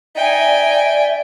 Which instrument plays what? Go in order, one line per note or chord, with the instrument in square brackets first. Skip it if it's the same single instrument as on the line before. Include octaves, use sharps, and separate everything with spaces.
[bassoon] D#4 [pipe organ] D5 E5 [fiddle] G5 G#5